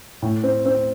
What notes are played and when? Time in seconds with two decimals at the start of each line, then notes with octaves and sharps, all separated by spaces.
0.22 A2
0.44 C4
0.66 C4